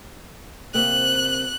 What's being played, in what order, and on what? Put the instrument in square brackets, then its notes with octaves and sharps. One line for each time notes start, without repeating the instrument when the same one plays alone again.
[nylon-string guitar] C3 A#3 C4 [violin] F#6